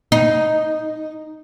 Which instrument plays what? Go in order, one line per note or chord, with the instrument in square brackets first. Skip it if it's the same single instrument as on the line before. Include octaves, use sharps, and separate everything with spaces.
[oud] D#4